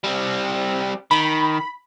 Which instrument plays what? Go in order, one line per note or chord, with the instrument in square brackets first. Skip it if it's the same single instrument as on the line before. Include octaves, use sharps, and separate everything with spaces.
[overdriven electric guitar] G3 C4
[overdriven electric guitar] D#3 [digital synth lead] B5